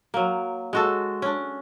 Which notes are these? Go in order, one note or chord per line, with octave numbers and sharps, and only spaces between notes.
F#3 A#3
G#3 F#4 A4
C#4 D4